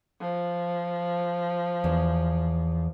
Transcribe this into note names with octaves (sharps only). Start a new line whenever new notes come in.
F3
E2